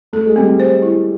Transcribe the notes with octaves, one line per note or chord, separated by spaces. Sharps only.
A3 A4
G#3
G3 C4
G#3
C5
E4